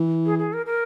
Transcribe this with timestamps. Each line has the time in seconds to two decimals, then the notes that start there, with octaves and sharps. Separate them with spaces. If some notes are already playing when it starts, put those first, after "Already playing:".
Already playing: E3
0.26 G#4
0.38 G#4
0.53 A#4
0.66 A#4